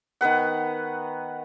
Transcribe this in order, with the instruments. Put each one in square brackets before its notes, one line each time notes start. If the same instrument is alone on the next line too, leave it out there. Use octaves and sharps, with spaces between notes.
[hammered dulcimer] D#3 B3 B4 F#5